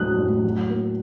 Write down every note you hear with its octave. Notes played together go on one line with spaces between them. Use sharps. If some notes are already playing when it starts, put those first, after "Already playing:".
Already playing: A2 F#3 D#6 F#6
A2
F#3
A#3